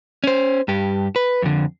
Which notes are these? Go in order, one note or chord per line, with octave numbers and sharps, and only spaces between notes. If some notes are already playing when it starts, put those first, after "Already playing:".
C#4 C5
G2 G4
B4
F2 D3